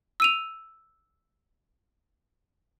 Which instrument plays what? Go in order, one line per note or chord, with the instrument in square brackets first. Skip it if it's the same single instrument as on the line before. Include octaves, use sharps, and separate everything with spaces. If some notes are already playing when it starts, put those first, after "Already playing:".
[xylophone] E6 D#7 F7